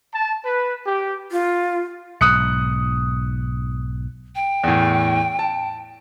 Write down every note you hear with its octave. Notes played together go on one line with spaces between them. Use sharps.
A5
B4
G4
F4
B1 G#2 D#6 F#6 C#7
G5
E2 A2
A5